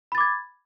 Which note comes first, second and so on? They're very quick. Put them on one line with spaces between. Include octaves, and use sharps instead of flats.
B5 A6 D6 G#6